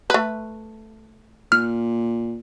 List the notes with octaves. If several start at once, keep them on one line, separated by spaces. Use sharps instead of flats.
A3 B4
A#2 F6